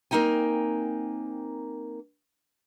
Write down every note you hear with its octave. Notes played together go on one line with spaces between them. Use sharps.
A#3 C4 D#4 G5 G#5